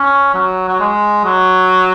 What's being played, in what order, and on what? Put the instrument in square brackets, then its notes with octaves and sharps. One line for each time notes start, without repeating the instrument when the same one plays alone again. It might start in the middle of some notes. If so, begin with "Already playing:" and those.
Already playing: [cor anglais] C#4
F#3
F#3
G#3
F#3